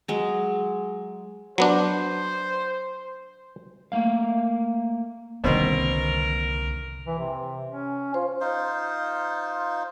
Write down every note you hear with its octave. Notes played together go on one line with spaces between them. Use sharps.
F#3 G#3
F#3 B3 D4 C5
A3 A#3 F5
C2 F2 B2 D3 D#3 A#3 C4 A#4
E3
C3
C#4
F4 C5
D#4 F4 C5